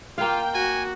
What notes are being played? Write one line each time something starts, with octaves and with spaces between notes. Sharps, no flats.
A#3 F4 F5 G5
F#4 G#5